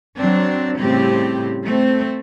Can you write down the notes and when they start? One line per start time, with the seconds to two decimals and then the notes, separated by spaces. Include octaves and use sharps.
0.15 F#3 C4 D4
0.78 A2 C#3 G3 C4 G4
1.64 A3 C4